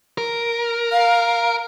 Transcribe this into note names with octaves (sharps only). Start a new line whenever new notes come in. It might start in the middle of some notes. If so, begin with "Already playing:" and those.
A#4
F5